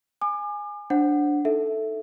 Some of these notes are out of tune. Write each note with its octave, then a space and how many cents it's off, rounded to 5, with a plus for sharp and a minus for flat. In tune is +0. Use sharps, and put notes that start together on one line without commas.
G#5 -5 D6 +40
D4 +0 C5 +15 F#5 +0
D#4 +5 A4 +0 E5 -5